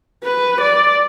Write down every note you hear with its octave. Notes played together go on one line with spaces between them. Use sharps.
B4
D5